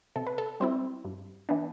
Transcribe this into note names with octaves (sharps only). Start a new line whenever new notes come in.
C3 A4
B4
A4
G3 C4 E4 C5
G2
E3 B3 D4